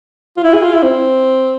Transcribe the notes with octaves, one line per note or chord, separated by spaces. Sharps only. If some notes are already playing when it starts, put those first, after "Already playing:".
F4
E4
G#4
F4
E4
C4